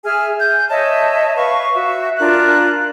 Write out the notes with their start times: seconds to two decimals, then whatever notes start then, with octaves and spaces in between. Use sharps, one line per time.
0.04 G#4 E5 G#5 F6
0.39 G6
0.69 C#5 D#5 E5 A5
1.36 B4 F5 C#6
1.73 F#4 E5
2.19 D4 F4 A#4 F#6